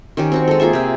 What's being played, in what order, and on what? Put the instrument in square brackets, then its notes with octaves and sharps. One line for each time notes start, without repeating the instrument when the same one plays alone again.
[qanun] D#3 C#4 G4
C4 F#4 C#6
G#3 A4
A#3 F4 G#4 E5
C3 C4